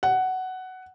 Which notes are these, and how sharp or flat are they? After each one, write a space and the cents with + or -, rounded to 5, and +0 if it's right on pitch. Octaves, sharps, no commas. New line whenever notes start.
F#5 +10